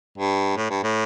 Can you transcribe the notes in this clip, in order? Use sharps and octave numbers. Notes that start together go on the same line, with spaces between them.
G2
A2
G2
A2